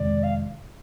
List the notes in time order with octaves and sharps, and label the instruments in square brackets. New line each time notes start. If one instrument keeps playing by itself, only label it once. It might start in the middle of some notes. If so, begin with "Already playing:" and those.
Already playing: [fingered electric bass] F2 C3 D#3 G#3 [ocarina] D5
[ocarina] F5